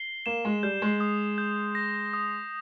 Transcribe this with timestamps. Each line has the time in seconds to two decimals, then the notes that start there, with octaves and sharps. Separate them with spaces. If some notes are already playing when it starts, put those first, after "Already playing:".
Already playing: C7 G7
0.26 A#3 E7
0.45 G#3
0.63 G3 G6
0.82 G#3
1.00 D#6
1.38 G6
1.75 A#6
2.14 D#6